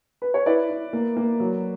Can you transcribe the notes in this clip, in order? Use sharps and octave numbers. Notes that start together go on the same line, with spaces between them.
B4
C#5
E4 B4 D5
E4
A#3
A#3
F#3